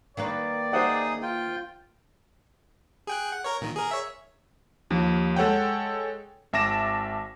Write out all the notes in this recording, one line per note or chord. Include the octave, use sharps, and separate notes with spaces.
D#3 A#3 B4 D5
D#4 G#4 C5 E5 F#5 D#6
F4 G5
G#4 G5 F#6
F#5
A#4 C#5
A#2 D#3
G#4 A#4
C#5 E5
D#2 F3
G#3 A4 C#5 F#5 G5
G#1 E5 A5 D6 A#6 E7